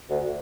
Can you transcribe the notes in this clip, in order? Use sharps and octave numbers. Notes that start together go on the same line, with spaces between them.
D2